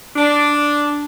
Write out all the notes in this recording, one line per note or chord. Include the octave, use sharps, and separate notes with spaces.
D4